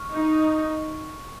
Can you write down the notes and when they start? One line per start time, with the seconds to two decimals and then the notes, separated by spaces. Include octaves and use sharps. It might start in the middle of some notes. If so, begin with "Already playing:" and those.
Already playing: C#6 F6
0.12 D#4